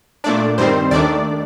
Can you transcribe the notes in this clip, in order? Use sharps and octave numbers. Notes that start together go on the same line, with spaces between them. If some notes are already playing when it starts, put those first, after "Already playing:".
A#2 A3 D4 D5
G2 D#3 G3 C4 C5
D#2 D#3 A3 D4 D5